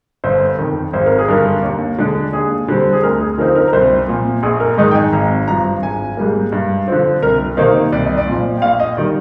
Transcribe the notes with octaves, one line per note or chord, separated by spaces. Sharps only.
G1 C5
F2 D#3
G#1 C5
A#4
G#4
G2 D3 A#4
D#2
D3 G#3 D4
D#2 G#4
D3 G3 C4
G#4
D2 A#4
G#4
D3 F3 C4 D#4 A#4
A#4
A#4
C2 C5
A#2 F3
A#1 G#4
A#4
G#2 D#3 G#3 D#4 D#5
G5
G#5
G#1 A#5
G2 F3 A#5
G#1 G#5
G#2 G3 A#3
G2
D3 F3 C4
C2 A#4
C3 D#3 A#3 D#4 C5
C2 D5
D#5
D5
A#2 F3
G5
A#1 F5
D#5
D#3 G3 D5